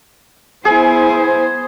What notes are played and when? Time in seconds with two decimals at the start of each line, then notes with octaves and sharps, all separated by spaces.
0.65 B3 E4 G#4 C5 G#5